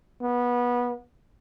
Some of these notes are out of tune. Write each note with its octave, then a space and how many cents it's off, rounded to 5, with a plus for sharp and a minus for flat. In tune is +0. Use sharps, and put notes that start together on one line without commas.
B3 -20